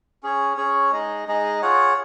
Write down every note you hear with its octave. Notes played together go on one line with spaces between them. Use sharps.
C#4 G#4 C#5
C#4 G#4 C#5
G#3 D#4 G#4 D#5
G#3 D#4 G#4 D#5
F4 G#4 C#5 F#5